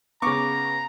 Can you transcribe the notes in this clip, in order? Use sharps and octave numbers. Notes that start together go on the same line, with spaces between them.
C#3 B3 A#5 C#6 D6